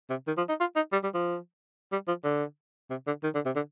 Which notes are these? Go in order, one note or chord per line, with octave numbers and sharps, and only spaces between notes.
C3
D#3
F3
D#4
F4
D#4
G3
G3
F3
G3
F3
D3
C3
D3
D#3
D3
C3
D3